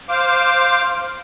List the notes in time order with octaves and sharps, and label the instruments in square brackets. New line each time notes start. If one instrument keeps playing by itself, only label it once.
[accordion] C5 F5 D6